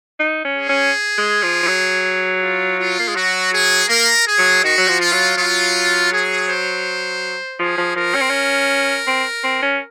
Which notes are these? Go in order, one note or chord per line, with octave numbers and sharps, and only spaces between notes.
D#4
C#4
G#4
C#4
G#3
F3
F3
F#3
F4
F4
A#3
G#3
F#3 F#4
G#4
A#3 A#4
G#4
F#3
D#3 F#4
F#3
F3
F4
F#3
F#3 F4
G#4
C5
F3 G#4
F3
F3 A#4
C#4
C4
C#4
C4
C4
C#4